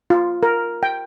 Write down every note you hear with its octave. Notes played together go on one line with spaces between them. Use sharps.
F4
A#4
G5